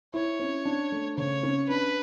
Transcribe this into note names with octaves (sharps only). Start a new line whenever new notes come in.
E4 C#5
C#4
D4
A3
C#3 C#5
C#4
D4 B4